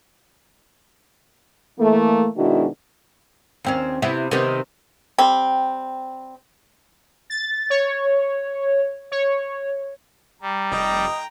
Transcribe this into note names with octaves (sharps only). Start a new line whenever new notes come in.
E3 A3 A#3
B2 D#3 G#3 D4 E4 F#4
D#2 C4 C#4
C3 B3 E4
C3 D#3 B3
G3 C4
A6
C#5
C#5
G3 A#5
F1 A2 D#5 G5 A#5